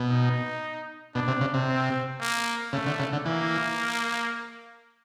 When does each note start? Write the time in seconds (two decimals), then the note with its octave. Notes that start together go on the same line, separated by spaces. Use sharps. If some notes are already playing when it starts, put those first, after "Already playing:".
Already playing: B2
0.09 D#4
1.15 B2 D4
1.28 C3
1.41 C#3
1.54 C3
1.68 C4
2.20 A#3
2.73 C#3 A3
2.87 D3
2.99 C#3
3.13 D3
3.26 E3 A#3